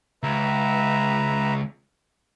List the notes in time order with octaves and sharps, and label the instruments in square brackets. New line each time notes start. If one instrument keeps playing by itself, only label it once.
[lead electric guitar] C#2 [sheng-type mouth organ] B4 E5 A#5